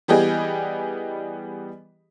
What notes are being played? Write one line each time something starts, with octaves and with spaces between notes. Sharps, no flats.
E3 G3 B3 G4 G#4 D#5